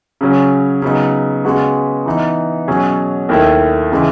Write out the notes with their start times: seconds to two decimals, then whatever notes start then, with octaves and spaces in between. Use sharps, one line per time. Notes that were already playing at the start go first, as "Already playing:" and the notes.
0.21 C#3 F#3 C#4
0.82 C#3 F#3 B3 D#4
1.45 C#3 G#3 B3 F#4 B4
2.06 E3 B3 D#4
2.68 B2 F#3 C#4 G#4
3.29 D#2 D#3 A3 E4
3.92 C#3 E3 G#3